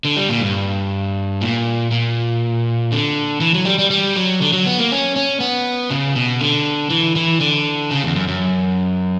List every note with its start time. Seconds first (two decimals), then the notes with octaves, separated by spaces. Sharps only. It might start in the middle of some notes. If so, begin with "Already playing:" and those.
0.05 D3
0.17 G3
0.29 A#2
0.41 G2
1.41 A#2
1.91 A#2
2.92 D3
3.41 E3
3.54 F#3
3.65 G3
3.79 G3
3.90 G3
4.16 F#3
4.42 D3
4.53 F#3
4.66 B3
4.79 A#3
4.91 C#4
5.16 C#4
5.40 B3
5.91 C#3
6.16 B2
6.41 D3
6.90 E3
7.16 E3
7.40 D3
7.91 C#3
8.03 E2
8.16 F#2
8.28 F#2